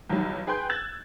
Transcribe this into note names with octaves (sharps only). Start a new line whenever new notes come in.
B1 E2 D#3 F#3 G3
G#4 B4 G5 C6 G6
E6 F#6 G#6 A6 F#7